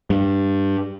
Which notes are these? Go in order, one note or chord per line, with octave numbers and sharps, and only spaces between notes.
G2